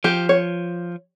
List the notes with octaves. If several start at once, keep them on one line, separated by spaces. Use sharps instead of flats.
F3 G4
C#5